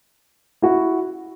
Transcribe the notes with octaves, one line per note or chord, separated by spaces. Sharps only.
E4 F#4